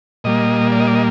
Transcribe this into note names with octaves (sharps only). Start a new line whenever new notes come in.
A#2 G3 A#3 D#5
D5
D#5
D5
D#5